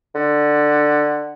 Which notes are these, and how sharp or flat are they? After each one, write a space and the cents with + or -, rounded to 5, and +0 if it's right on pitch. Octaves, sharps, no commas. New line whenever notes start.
D3 +15